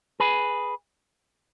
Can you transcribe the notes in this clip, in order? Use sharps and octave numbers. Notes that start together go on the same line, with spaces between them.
G#4 B4